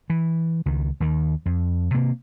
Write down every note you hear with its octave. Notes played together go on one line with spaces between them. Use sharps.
E3
C#2 D#3
D#2 D#3
F2
C3 A#3